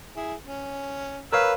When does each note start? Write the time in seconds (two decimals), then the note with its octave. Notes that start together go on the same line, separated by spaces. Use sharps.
0.17 E4 G#4
0.46 C#4
1.33 A#4 B4 C#5 F5 E6